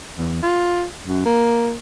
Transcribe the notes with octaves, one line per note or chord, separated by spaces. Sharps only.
E2
F4
F#2
A#3